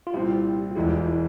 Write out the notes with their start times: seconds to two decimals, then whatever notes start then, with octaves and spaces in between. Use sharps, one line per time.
0.07 F4
0.13 C2 A#2 F3 C4 E4 G4
0.71 F4
0.75 E1 E2 E3 G#3 E4 G4
0.91 F4
1.07 E4